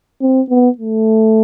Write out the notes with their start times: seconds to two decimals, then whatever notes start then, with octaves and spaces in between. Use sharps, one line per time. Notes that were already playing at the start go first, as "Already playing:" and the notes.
0.21 C4
0.50 B3
0.78 A3